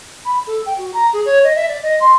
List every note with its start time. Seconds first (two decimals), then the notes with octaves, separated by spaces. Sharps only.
0.25 B5
0.46 A4
0.65 G5
0.78 F#4
0.93 A#5
1.13 G#4
1.25 C#5
1.43 D#5
1.55 E5
1.68 D5
1.82 D#5
2.00 C6